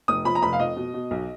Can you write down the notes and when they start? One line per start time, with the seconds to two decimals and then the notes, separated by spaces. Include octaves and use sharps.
0.08 F1 D#6
0.25 F3 B5
0.35 A#5
0.42 F1 B5
0.53 F5
0.60 F2 D#5
0.76 B2
0.94 B2
1.11 B1